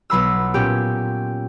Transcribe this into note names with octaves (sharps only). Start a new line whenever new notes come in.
B1 F#3 B5 E6
A#2 C#4 G4